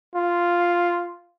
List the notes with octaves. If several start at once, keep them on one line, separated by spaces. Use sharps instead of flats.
F4